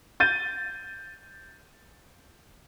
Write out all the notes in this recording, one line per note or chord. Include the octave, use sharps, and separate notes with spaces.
G6 A6 D#7